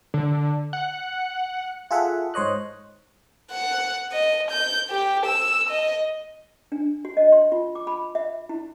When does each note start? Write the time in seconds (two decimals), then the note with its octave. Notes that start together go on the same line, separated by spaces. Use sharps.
0.14 D3
0.73 F#5
1.91 F4 G#4 A4 E5 F#5
2.34 G#2 C5 C#5 D#5 F#6
3.51 F#5
4.13 D#5
4.51 G6
4.90 G4
5.26 E6
5.70 D#5
6.72 D4
7.05 F#4
7.17 D#5
7.32 C6
7.52 F4
7.75 D6
7.87 B5
8.15 E5
8.49 E4